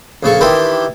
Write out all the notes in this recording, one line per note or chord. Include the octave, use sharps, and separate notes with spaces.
A#1 C#3 A4 C#6
D#3 E3 D4 E4 G4 C6